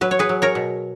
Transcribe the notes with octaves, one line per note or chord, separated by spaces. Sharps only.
F#3 B4
C#5
G#4 B4
F#3
A#4 C#5
B2